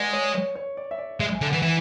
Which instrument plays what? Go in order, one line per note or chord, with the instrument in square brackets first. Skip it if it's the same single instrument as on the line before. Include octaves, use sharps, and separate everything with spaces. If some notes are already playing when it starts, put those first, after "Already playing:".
Already playing: [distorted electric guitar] G#3 [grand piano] B4 D5 F#5
[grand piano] C#5
C#5
C#5
D5
E5
D5
[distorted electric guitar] G#3 [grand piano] E5
[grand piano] G#5
[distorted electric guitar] D3
[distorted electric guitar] E3 [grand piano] F#5
[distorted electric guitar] E3